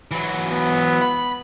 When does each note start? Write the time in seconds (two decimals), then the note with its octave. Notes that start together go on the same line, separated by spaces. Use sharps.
0.11 E3 F#3
0.51 B3
1.02 B5